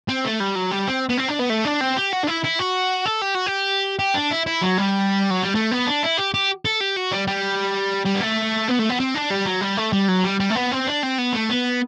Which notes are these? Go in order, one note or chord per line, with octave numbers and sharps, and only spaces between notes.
C4
A3
G3
F#3
G3
C4
B3
C4
D4
B3
A3
D4
C4
G4
F#4
D4
E4
E4
F#4
A4
G4
F#4
G4
G4
D4
E4
E4
F#3
G3
F#3
G3
A3
B3
D4
E4
G4
G4
A4
G4
F#4
G3
G3
G3
B3
A3
B3
A3
B3
C4
D4
G3
F#3
G3
A3
G3
F#3
G3
G3
A3
B3
C4
D4
C4
B3
A3
B3